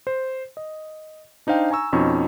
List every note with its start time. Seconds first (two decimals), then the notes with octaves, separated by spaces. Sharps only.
0.07 C5
0.57 D#5
1.47 D4 D#4 C5 F5 G5
1.71 G#5 A#5 C#6 E6
1.93 F2 B2 C#4 D#4 C#6